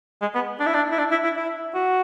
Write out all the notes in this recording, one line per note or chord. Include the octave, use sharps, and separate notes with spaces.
G#3
B3
D4
E4
D4
E4
D4
E4
E4
E4
F#4